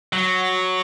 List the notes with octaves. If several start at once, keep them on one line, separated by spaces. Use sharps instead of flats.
F#3